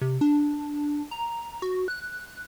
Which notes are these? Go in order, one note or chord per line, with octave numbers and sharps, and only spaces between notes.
C3
D4
A#5
F#4
F#6